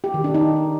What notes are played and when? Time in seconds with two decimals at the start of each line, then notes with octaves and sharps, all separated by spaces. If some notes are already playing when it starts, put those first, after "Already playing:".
0.04 G4
0.14 D#3
0.24 D4
0.34 D#4